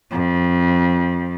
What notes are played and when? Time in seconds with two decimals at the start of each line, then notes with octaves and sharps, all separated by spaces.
0.11 F2